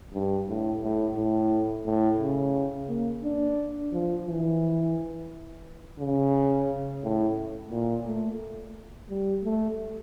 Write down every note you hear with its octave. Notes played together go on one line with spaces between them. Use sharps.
G2
A2
A2
A2
A2
C#3
A#3
D4
F3
E3
C#3
A2
A#2
A3
G3
A3